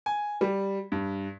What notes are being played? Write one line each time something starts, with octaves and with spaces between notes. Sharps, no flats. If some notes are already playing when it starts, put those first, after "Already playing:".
G#5
G3
G2